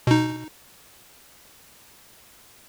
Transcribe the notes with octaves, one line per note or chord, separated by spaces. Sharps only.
B2 D#4